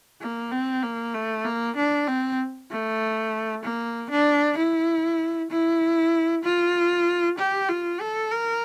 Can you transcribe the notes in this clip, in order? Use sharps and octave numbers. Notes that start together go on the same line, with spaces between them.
A#3
C4
A#3
A3
A#3
D4
C4
A3
A#3
D4
E4
E4
F4
G4
F4
A4
A#4